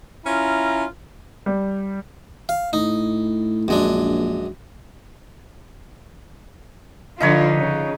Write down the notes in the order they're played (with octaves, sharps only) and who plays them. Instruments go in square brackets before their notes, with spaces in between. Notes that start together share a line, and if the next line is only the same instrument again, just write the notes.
[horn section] C#4 E4 F4 A#5
[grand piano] G3
[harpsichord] F5
[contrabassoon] A2 [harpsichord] D#4
[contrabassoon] A#1 [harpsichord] F#2 G#3 D4
[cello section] D3 F3 F4 [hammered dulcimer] D#4 B4 C#5
[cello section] C#3